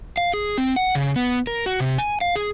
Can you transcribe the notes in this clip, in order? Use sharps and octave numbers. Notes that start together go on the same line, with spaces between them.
F5
G#4
C4
F#5
C#3
B3
A#4
F#4
C3
G#5
F5
G#4